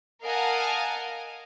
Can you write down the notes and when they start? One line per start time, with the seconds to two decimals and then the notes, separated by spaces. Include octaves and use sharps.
0.23 A#4 D#5 F5 F#5 G#5 A5